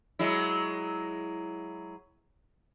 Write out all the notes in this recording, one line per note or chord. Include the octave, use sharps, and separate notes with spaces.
F#3 G#3 E4